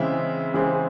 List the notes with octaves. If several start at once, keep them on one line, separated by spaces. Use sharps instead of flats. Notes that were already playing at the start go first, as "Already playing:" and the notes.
Already playing: C#3 E3 G#3 C4 E5
C#3 E3 G#3 C4